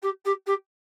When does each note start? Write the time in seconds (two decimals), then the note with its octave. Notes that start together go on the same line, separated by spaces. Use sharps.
0.02 G4
0.25 G4
0.46 G4